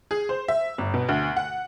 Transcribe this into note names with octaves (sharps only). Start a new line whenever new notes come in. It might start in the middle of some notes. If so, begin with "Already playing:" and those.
G#4
C5
E5
G1
B2
D2
F#5